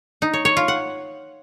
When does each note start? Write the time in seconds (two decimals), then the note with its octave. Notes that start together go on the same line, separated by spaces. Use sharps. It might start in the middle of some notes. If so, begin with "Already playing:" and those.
0.22 D#4
0.33 C#5
0.45 C#5
0.57 F4
0.68 F#5